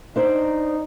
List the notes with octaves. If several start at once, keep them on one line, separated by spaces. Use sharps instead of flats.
D4 D#4 C5 D5